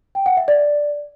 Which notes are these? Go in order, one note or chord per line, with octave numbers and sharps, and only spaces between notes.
G5
F#5
E5
D5